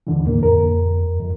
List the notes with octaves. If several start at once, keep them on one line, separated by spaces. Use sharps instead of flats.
D#2 D3 E3
A2 A#3
F2 A#4
F2